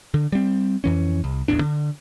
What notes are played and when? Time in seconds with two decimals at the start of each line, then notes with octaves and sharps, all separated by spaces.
0.14 D3
0.32 G3 C4
0.84 F2 E3 C#4
1.24 C2
1.48 D1 A1 E2 D4
1.61 D3